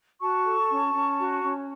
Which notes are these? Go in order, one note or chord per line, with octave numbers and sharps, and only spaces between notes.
F#4 A5 C#6
A4
C#4
C#4
F#4
C#4